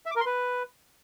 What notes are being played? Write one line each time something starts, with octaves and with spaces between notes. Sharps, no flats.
E5
D6
A#4
C6
B4